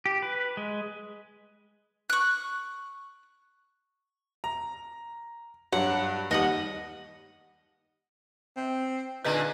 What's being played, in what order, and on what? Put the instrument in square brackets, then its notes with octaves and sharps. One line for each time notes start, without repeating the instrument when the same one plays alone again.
[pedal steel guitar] G4
B4
G#3
[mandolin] C#6 F#6
[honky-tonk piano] A#5
[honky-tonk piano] G2 F#3 [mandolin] F#5
[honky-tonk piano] D#2 G3 [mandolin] D#5 F#5 D#6
[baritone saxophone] C4
[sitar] A#2 D3 G#3 [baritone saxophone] D#4 [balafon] B4 D#5 A#5